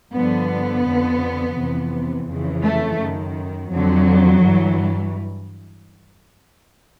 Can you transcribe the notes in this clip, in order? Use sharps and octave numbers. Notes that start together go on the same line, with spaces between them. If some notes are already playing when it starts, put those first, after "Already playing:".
G2 D3 F3 B3
F2 D3 F3
F2 C3 E3
F2 C#3 E3
A3
F#2 D#3
F2 D3 F3 F#3
G2 E3